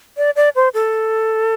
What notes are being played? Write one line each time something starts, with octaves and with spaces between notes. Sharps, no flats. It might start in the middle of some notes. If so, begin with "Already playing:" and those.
D5
D5
C5
A4